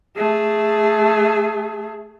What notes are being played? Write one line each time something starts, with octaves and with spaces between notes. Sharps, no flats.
A3 G#4